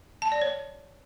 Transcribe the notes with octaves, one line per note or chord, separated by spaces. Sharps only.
A5
D5
C#5